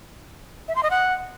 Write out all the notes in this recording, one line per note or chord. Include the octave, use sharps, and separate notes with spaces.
E5
C6
D#5
F#5